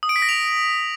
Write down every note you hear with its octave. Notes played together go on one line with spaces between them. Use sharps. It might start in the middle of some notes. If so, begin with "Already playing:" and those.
D#6
D7
B6
A#6
F7